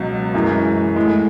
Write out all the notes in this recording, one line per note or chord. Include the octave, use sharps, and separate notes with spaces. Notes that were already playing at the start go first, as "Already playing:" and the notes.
Already playing: C#2 B2 F#3
F#2 E3 G#3
A2 G#3